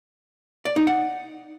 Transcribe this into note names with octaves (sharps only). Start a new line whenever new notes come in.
D5
D#4
F#5